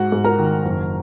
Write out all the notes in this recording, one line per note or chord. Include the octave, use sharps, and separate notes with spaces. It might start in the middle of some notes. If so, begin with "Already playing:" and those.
Already playing: G#2 F#4 F#5
G#2
A#4 A#5
D#3
F#1